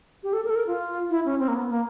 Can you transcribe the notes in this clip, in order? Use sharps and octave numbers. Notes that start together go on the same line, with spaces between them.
G4
A4
A#4
A4
A#4
F4
E4
C#4
C4
A#3
B3
A#3